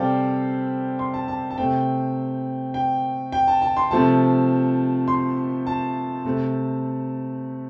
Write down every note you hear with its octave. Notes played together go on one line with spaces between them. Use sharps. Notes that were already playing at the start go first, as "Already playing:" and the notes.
Already playing: C3 G3 C4 A4 C5 D5 F5 G5
C6
A5
A5
A5
C3 A3 C4 G5
G5
G5
A5
A5
C6
C3 F3 A3 C4 A5
C6
A5
C3 A3 C4